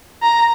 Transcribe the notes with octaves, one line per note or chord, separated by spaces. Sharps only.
A#5